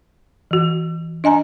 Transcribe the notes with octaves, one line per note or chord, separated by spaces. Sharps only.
E3 F#4
D4 D#5 G#5 A#5